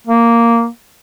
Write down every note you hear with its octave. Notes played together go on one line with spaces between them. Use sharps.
A#3